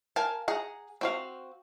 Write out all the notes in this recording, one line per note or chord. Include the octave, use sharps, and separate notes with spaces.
A#4 F5 G#5 A5
G#4 F#5 A#5
C4 F#4 F5